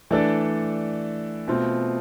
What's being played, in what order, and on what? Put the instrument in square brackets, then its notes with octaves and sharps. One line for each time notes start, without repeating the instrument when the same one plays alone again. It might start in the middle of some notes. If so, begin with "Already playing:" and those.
[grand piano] E3 A3 D4 A4 D5
B2 A3 C4 F4